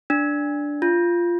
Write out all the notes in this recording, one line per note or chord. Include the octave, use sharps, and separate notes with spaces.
D4
F4